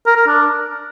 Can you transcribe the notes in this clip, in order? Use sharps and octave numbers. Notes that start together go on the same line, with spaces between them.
A#4
A#4
D4